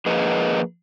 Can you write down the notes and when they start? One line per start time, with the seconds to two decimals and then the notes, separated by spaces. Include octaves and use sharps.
0.06 F3 A#3 G#4 A#4 B4 D#5